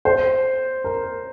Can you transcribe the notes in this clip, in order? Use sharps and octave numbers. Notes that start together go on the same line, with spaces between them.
C5
A#4